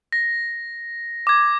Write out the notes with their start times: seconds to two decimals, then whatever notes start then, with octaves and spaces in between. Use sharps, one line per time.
0.12 A#6
1.27 D6 G#6